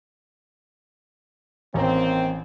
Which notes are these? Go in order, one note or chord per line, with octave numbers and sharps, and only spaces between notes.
A1 D#3 A#3 C4 A#5